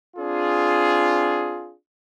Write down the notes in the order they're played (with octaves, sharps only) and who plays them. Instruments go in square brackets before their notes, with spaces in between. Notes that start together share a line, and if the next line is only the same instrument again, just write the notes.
[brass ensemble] C4 D4 F4 G#4